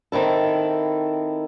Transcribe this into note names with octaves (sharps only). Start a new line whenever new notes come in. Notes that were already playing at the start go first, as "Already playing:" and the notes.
D#3 C4 E4 A4